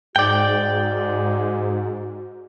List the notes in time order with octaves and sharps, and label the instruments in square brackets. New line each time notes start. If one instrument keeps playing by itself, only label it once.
[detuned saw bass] G#2 [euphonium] F#4 [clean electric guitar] D5 G5